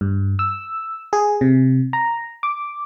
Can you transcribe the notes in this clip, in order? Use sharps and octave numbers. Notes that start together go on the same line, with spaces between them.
G2
E6
G#4
C3
A#5
D6